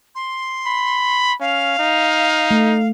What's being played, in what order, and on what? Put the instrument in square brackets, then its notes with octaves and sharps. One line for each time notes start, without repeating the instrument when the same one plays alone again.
[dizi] C6
[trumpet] B5
[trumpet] C#4 [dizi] F5
[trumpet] D#4
[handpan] A3